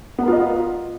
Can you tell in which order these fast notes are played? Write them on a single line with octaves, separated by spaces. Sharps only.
B3 A#4 F4 D#5